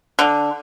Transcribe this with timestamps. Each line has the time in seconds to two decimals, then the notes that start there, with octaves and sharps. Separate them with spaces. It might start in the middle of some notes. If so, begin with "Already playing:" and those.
0.19 D3